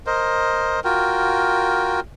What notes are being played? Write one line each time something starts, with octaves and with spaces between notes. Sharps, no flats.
A#4 C5 D#5
F4 F#4 A#4 G5